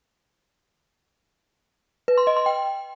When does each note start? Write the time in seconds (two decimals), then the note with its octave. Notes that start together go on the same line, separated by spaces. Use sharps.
2.08 B4
2.18 C6
2.27 D#5
2.37 C6
2.46 G5